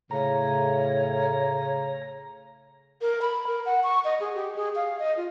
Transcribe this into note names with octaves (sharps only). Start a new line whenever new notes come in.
A2 C#3 C#5 A#5
A#4
B5
A#4
F#5
C#6
D#5
G#4
G4
G#4
F5
D#5
F4